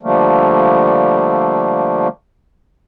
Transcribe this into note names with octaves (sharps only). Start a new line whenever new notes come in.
D3 F3 G3 A3 A#3